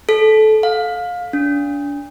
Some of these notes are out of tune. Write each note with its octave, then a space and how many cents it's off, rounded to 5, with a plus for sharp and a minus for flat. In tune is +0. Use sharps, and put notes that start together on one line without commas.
A4 -20
F5 +25
D4 -35